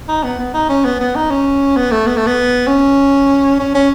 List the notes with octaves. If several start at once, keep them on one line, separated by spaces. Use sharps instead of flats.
D#4
B3
B3
D#4
C#4
B3
B3
D#4
C#4
B3
A3
B3
A3
B3
C#4
C#4
C#4